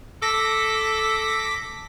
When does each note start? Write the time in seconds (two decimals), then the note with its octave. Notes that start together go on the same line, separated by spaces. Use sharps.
0.22 A4 A5 D6 A#6 B6